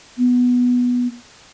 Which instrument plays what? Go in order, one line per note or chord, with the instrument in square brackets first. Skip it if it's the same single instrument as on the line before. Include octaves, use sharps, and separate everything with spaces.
[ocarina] B3